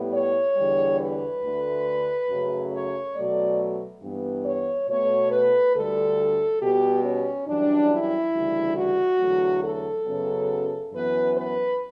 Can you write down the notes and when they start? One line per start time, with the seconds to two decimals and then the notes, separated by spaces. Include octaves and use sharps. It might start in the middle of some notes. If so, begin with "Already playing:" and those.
Already playing: A2 G3 B3
0.14 C#5
0.57 E2 D3 G3
1.00 B4
1.43 D2 D3 A3
2.29 F#2 C#3 F#3 A3
2.73 C#5
3.16 B2 F#3 A3 D5
4.02 G2 E3 B3
4.45 C#5
4.88 B2 A3 C#5
5.31 B4
5.74 D2 D3 G3 A4
6.61 B2 G3 B3 G4
7.04 C#4
7.47 F#2 E3 G3 D4
7.90 E4
8.33 D2 C#3 E3 G3
8.77 F#4
9.20 E2 D3 F#3 A3
9.63 A4
10.07 F#2 C#3 F#3 B3
10.92 F#2 E3 B3 B4
11.36 B4